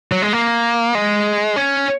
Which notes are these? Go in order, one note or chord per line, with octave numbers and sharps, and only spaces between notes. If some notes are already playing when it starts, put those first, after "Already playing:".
F#3
G#3
A#3
G#3
C#4